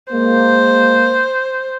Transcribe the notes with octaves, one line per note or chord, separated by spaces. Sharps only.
G#3 A#3 C5